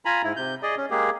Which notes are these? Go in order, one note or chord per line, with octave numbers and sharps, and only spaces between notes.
F4 G#5 A#5 B5
G#2 E4
C3 G6
G#4 D5 D#5
C#4
G#3 A#3 G4 G#4